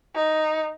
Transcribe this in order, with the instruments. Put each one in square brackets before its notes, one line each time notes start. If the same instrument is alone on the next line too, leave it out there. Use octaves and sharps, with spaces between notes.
[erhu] D#4